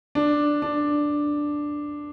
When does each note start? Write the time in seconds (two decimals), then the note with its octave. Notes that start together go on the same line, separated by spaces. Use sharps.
0.15 D4
0.62 D4